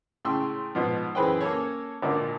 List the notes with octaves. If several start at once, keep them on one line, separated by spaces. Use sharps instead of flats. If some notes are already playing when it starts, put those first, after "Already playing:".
A2 C#3 G5 C6 C#6 E6
G#2 B2 F3
F#2 E3 G#4 B4 C5 G5
A#3 C#4 A4 C#5
G#1 A#2 D3 A#3